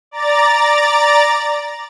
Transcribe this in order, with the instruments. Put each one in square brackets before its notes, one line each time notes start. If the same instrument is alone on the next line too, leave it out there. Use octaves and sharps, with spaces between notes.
[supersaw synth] D5 A#5 A6